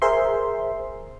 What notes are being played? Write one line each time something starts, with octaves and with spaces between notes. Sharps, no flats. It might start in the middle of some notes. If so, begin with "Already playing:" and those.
G#4 A#4 C5 E5 C6